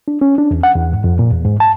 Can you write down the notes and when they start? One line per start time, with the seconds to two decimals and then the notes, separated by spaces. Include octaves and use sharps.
0.08 D4
0.21 C#4
0.38 D4
0.51 E2
0.63 F#5
0.75 E2
0.93 G#2
1.04 F2
1.19 A#2
1.31 E2
1.44 G#2
1.60 A5